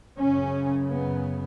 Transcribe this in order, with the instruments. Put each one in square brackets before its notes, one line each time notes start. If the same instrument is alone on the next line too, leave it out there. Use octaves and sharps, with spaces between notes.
[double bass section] F#2 C#3 C#4
B3